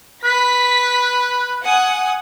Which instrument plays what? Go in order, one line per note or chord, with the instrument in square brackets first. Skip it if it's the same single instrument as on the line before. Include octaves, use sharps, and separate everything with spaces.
[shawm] B4 [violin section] B6
[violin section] F#5 G#5 D#6